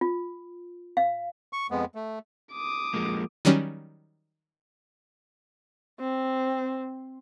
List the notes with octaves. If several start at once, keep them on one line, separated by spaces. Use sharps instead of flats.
F4
F5
C#6
F2 G#3 B3
A3
D6 D#6
F3 G#3 A#3
D#3 F#3 G3 C#4
C4